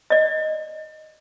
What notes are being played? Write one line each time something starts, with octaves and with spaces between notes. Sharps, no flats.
D5 D#5